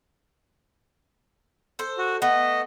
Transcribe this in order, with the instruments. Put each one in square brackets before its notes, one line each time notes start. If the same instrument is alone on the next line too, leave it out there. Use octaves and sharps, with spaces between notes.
[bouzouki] A4 C5
[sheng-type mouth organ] F#4
[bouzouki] A3 B3 [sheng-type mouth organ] D#5